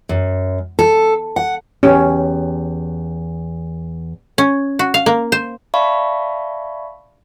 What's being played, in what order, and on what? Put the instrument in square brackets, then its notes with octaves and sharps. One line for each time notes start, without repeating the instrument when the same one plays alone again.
[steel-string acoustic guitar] F#2
A4
F#5
[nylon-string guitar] E2 G4 [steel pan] C#4
[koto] C#4
F#4
F5
A#3
C5
[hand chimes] D5 E5 F5 A5 B5 C#6